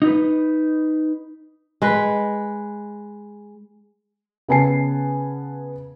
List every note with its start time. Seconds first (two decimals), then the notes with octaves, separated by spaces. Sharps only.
0.02 D#4 B4
1.82 G#3 B4
4.48 C#3 B3 G#5 A5 C7